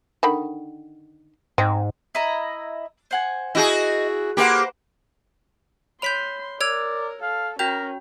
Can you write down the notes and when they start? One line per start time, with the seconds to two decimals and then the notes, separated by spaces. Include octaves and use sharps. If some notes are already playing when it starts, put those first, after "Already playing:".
0.23 D3 D#3 B5
1.58 G#2 C4 D#5
2.15 E4 D#5 A#5
3.11 C5 F#5 G#5
3.55 E4 F#4 G#4 D#5 G6
4.37 A#3 G4 B4 C5 F#5
6.02 C#5 B5 C6 G6 B6 F7
6.61 A#4 C#5 D5 E6 G#6 F7
7.22 A4 F5
7.59 C#4 F#4 A#4 G5 G6 F7